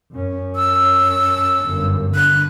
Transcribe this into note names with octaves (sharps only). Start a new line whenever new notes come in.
F#2 C#4
E6
G1 F#2
D3 F#6